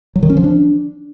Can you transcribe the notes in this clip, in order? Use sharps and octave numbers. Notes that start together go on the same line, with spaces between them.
F#3
D#3
C#4
F3
D4